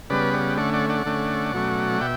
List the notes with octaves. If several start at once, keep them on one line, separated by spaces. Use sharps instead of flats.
C#3 G3 B3 B4 D5
D5 F#5
D3 A3 C#4 D5 F#5
D5 F#5
D5 F#5
D3 A3 C#4
B2 F#3 A3 C#4
B2 E5 G5